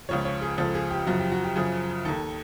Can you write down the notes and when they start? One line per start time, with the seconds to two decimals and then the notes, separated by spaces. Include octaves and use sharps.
0.09 C#2 C#3 F3 C#5
0.25 C#5
0.41 G#4
0.58 C#2 C#3 F3 A4
0.74 G#4
0.91 G4
1.07 F#2 C#3 F3 F#4
1.19 G4
1.32 F#4
1.44 G4
1.56 F#2 C#3 F3 G#4
2.05 D#2 D#3 A4